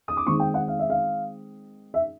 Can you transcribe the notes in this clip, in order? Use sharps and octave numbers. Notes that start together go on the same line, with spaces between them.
D#6
D6
D#3 G#3 C4 C#6
G5
F#5
F5
E5
F5
E5